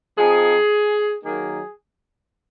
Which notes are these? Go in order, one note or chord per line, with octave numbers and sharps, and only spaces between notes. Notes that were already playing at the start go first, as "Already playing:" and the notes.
F3 C4 D#4 G#4
D#3 F#3 A#3 D#4 G#4